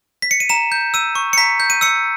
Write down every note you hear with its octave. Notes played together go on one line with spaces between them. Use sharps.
B6
C#7
D#7
A#5 E7
G6
E6 D#7
C#6
C#7
A#5 B6
G6
D#7
E6 C#7